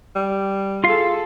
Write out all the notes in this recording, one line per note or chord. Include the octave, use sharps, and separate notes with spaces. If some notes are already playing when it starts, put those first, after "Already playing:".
G3
F4 G#4 A4 F5